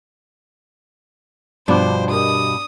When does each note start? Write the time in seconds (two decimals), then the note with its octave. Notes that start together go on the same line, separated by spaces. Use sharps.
1.68 G2 B2 F3 D4 C5 D6
2.10 G4 A#4 D#5 D#6